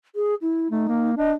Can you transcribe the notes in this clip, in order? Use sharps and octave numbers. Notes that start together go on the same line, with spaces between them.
G#4
E4
A3 D#4
A#3
D4 D#5